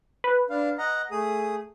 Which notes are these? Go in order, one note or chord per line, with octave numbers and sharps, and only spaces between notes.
B4
D4 F5
D#5 F#5 A#5
A3 G#4 D#6